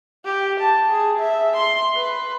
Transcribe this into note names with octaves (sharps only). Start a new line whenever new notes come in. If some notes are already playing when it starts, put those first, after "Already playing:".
G4
A5
G#4
E5
C6
B4